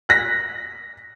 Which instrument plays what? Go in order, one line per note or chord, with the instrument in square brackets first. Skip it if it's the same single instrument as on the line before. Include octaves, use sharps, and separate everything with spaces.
[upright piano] F#6 A#6 B6